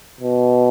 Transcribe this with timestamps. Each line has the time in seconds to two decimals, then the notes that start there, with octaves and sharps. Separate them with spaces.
0.21 B2